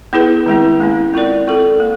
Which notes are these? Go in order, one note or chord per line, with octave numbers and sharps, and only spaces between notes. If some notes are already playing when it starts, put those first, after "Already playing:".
B3 E4 G#4 B4
D#3 G#3 C4 E4
A#3 C#4 E4
C4 F4 A#4 D5
C4 F4 A4
A#3